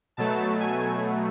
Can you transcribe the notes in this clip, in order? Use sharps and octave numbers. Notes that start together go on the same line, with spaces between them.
B2 F#3 A3 A5
G#5